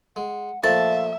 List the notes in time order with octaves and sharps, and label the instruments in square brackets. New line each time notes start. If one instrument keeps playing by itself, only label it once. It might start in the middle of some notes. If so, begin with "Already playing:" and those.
[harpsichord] G#3 [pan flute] F#5
[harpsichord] A#2 F3 A3 [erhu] E5 [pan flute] F5 [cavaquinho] A5